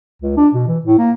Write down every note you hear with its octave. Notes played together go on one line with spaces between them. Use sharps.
C#2
D4
B2
E3
A2
A#3